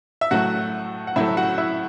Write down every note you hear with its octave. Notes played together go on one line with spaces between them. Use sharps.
E5
A2 F#3 A3 F#4 F#5
F#5
A2 F#3 A3 E4 E5
F#4 F#5
E4 E5